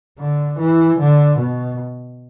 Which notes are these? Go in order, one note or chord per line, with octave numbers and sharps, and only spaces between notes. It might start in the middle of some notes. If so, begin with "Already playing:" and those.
D3
E3
D3
B2